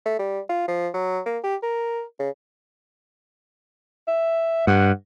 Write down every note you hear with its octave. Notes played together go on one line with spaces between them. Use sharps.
A3
G3
F4
F3
F#3
A#3
G4
A#4
C#3
E5
G2 F#5